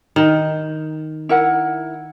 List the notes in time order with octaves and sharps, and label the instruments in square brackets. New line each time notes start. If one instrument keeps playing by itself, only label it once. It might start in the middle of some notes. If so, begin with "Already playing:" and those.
[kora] D#3
[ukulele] E4 A#4 F#5